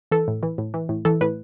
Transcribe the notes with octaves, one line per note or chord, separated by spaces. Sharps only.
E3 A4
A2
E3
A2
E3
A2
E3 A4
A2 B4